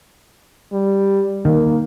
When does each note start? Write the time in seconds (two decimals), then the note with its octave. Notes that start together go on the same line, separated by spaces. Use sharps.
0.73 G3
1.45 D#3 A#3